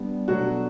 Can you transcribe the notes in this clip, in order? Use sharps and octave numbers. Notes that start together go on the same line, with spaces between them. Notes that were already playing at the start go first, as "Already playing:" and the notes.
Already playing: G3 B3 D4
B2 F#3 A3 D4 F#4